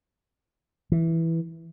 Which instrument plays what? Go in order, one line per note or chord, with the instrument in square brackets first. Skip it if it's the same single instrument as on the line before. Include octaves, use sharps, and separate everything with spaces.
[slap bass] E3